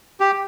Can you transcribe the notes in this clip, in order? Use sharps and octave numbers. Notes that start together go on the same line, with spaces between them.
G4